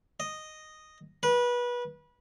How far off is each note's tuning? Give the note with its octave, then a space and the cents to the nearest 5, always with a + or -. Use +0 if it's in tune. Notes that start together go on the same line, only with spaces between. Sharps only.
D#5 -5
B4 -25